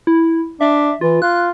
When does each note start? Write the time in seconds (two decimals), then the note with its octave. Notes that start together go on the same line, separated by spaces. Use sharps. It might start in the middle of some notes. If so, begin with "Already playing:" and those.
0.07 E4
0.61 D4 E5
1.01 E3 F4
1.22 F4 F#6